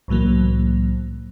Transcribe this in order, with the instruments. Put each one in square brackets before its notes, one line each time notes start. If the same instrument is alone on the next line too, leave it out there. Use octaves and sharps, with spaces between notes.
[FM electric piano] C2 A2 E3 F#3 A#3